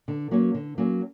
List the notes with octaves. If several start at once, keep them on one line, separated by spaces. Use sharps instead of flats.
D3
F#3 A#3 C#4
D3
F#3 A#3 C#4